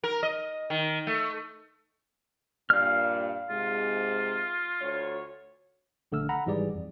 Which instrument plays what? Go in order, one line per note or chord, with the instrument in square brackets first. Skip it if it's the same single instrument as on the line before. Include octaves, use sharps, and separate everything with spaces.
[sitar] A#4
D#5
D#3
A3
[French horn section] G2 A#2 D5 [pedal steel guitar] F5 F6
[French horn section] G#2 C3 G#3 [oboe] F4
[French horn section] D2 C#5
[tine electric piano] A#1 D3 A3 E6 F6
F#5 A#5 B5
G#1 G#2 E3 G3 G#4 D5
F2